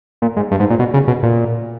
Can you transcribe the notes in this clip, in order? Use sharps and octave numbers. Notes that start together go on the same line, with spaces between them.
A#2
G#2
G2
G#2
A#2
B2
C#3
B2
A#2